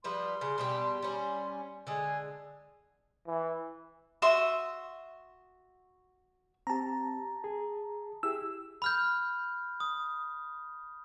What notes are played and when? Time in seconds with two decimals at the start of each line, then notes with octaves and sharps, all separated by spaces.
0.04 F3 G3 B4 C6
0.41 C#3
0.58 B2 G3 G4
1.02 G3 C#4
1.87 D3 G#3 G#5
3.27 E3
4.22 F#4 E5 C6 D#6
6.67 C4 G4 A5 A#5
7.44 G#4
8.23 E4 G4 G#4 E6
8.82 B5 F6 G6
9.80 D#6